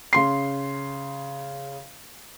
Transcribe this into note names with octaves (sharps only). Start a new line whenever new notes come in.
C#3 C6 C7